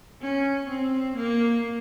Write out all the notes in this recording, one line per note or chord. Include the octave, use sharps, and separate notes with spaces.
C#4
C4
A#3